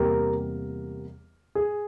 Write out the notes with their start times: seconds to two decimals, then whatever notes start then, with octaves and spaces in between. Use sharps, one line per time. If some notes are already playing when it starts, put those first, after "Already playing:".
Already playing: E2 C3 G3 A#3 G4 A#4
1.55 G#4